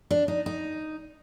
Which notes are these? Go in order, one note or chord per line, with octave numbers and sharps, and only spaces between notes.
D4
D#4
D#4